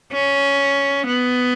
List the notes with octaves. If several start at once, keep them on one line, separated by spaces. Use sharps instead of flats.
C#4
B3